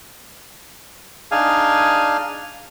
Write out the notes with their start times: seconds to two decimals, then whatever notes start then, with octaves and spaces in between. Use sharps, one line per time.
1.31 D4 D#4 G#4 F5 G#5